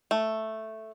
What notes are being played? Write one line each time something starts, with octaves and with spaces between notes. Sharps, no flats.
A3